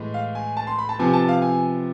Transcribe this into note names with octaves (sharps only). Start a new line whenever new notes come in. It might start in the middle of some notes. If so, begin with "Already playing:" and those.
Already playing: A2 E3 G#3
F5
G#5
A5
C6
B5
A5
C3 F3 B3 G#5
A5
F5
G#5